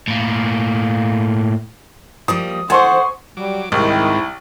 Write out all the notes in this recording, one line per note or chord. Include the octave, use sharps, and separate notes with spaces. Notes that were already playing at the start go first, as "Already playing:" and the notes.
A2 A#3
F3 G3 A#3 D#6
A4 C5 F#5 G#5 C6 C#6
F#3 G3 D6
C2 G#2 D#3 G#3 C4 E4